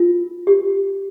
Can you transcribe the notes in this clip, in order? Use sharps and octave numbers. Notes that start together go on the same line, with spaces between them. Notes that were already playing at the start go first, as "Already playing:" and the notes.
Already playing: F4
G4